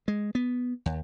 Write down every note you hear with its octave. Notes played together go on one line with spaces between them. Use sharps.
G#3
B3
D#2